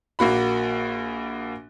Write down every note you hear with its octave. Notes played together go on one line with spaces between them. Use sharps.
A#1 A#3 F#4 B5